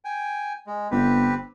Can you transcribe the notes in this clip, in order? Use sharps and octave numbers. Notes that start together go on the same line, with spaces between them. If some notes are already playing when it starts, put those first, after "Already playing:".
G5 G#5
G#3
G1 C4 G4 B4